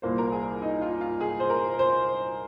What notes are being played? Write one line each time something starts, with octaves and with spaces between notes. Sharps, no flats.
C2 A#2 A#3 C5
A#4
G#4
D#4
F4
F4
G#4
C5
A#4
C5